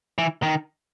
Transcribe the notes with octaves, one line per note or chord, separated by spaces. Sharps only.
E3
D#3